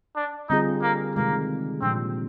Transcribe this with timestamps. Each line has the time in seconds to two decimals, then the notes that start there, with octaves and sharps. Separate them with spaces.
0.16 D4
0.49 D3 G3 C4 D#4 F4 G#4
0.82 A#3
1.15 C3 D#3 G#3 A#3
1.82 A#2 F3 G#3 C4 D4